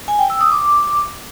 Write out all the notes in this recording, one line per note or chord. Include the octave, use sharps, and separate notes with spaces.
G#5
G5
E6
D#6
D6